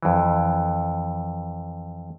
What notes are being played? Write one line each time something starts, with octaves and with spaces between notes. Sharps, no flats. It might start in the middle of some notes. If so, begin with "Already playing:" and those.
F2 E3